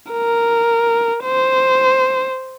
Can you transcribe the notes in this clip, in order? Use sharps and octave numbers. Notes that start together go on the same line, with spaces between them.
A#4
C5